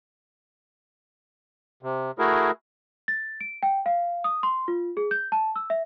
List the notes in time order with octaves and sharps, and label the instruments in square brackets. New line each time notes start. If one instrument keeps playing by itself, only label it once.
[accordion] C3
A3 E4 F#4 G#4 A#4
[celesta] A6
D7
G5
F5
D#6
C6
F4
G#4
G6
A5
E6
E5